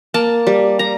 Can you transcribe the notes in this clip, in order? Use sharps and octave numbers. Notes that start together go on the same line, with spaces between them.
A#3 A5
G3
G3 A#5